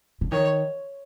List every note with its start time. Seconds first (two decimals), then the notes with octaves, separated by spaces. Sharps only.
0.21 D3
0.32 D#3 C#5